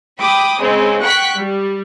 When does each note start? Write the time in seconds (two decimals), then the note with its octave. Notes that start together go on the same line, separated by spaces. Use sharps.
0.18 G5 B5 D6 D#6
0.59 C#3 G#3 C4
1.01 F#5 G5 C#6 F#6 B6
1.37 G3